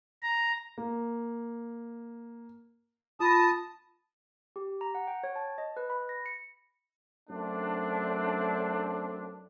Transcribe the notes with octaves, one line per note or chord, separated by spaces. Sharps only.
A#5
A#3
F4 A5 B5 D#6 A#6
G4
A#5
F#5
G5
C#5
A5
D#5
B4
B5
A#6
C#7
F#2 A3 C4 D4